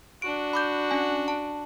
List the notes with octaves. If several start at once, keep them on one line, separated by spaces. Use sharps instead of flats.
D4 F#4 D7
B5 D6 G6
C#4 G#5
A5